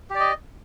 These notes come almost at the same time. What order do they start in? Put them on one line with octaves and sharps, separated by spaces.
G4 D5 D#5